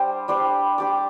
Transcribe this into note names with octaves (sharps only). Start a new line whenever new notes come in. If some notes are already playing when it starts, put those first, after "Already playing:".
Already playing: G3 D4 G4 C5
G3 D4 G4 C5
D4 G4 D5